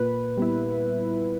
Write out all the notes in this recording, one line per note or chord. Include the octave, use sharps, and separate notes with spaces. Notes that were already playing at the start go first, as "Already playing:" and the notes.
Already playing: A#2 B4
G3 B3 E4